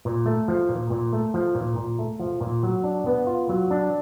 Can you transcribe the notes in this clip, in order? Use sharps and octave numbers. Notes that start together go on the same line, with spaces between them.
A#2
A3
F3
A#2
A#2
A3
F3
A#2
A#2
A3
F3
A#2
F#3
D4
B3
F4
F#3
D4